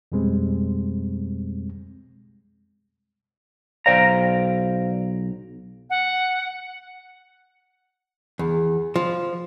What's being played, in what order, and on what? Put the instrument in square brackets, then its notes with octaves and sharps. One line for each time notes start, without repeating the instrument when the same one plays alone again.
[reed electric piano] F2 B2 G3 G#3 C4
[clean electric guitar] B1 G5 A#5 [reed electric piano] C5 D5 F5
[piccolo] F#5
[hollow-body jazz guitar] E2
F3